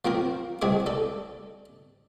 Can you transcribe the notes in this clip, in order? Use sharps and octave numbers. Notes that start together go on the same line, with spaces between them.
F3 A#3 C4 A#4
C2 G#3 C4 G#4 D6
A4 D5